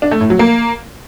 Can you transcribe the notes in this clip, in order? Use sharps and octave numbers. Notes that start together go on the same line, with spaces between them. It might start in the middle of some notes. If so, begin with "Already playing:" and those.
D4
A3
A2
F#3
A#3